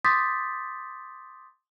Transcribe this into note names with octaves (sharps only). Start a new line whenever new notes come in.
C6 D6 D#6 G6 A6 B6